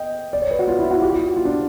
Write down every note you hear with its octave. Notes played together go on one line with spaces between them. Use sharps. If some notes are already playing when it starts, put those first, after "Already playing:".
Already playing: D#5 G5
D5
C#5
B4
F#4
F4
E4
F#4
G4
F#4
F4
D4